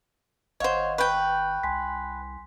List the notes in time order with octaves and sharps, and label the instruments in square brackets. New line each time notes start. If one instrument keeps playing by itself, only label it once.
[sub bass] G#1 [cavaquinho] C5 C#5 [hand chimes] D#5 F5 F#5
[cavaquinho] B4 G5 [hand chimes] C#6 G6
[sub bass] C2 [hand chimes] G#5 C6 B6